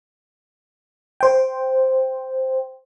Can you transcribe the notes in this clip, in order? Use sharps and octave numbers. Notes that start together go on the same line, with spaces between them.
C5 G5